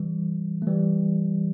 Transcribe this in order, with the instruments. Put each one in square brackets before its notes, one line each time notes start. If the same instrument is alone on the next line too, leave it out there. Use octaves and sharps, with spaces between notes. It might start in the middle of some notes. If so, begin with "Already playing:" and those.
Already playing: [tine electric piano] E3 G3
A3
E3 G3